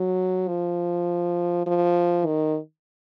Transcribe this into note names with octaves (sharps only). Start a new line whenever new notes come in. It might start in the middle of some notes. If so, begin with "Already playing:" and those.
Already playing: F#3
F3
F3
D#3